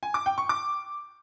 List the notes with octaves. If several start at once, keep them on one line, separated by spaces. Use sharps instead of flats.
G#5
D6
G5
C#6
D6